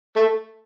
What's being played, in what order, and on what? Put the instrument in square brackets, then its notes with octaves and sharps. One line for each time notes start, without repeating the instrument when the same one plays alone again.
[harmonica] A3